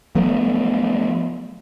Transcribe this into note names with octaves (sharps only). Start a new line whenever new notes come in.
F3 F#3 A3 B3